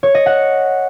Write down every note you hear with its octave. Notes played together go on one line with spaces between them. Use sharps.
C#5
D#5
F#5